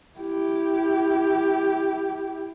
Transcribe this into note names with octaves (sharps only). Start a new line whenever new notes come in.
E4 G4